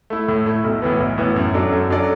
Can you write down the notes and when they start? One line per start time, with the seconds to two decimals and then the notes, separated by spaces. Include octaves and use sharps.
0.10 A3 E4
0.28 A2
0.46 A3 E4
0.64 B1
0.82 A2 E3 B3
1.00 B1
1.18 A2 E3 B3
1.36 F#2
1.54 F#3 D4 A4 D5
1.72 F#2
1.90 F#3 D4 A4 D5